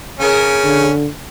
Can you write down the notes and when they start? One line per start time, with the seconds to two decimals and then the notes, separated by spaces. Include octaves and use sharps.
0.19 C#3 C#4 G#4 A#4
0.64 D3